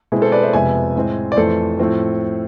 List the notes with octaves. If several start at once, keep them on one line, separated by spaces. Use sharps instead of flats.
B2 G#3 C4 E4 G#4
A4 C5
B4 D5
C5 E5
F2 C3 G#3 B3 E5 G#5
A2 G#3 C4
D5
F2 E3 A3 A4 C5
A2 F3 A3 C4